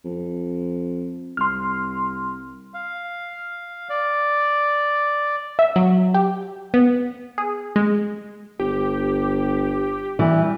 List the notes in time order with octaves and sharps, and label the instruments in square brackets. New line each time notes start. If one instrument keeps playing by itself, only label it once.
[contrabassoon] F2
[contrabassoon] C2 [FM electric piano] C6 F6
[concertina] F5
D5
[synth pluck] E5
F#3
G4
B3
G#4
G#3
[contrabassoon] G1 [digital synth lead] G4
[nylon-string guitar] E3 [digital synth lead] G3